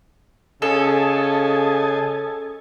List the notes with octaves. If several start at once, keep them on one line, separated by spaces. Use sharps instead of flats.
C#3 A4 D#5 G#5 A5